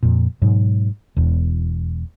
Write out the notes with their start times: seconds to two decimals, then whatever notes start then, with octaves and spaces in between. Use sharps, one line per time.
0.03 F2 A#2
0.42 G#2 B2 F#3
1.17 E1 E2